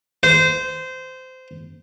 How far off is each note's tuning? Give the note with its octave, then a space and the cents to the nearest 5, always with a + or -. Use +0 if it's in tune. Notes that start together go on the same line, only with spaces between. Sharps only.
C5 -20